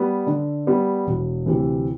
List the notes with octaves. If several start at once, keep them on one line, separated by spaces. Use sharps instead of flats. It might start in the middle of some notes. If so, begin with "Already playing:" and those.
Already playing: G3 B3
D3
G3 B3
E1
D2 C3 E3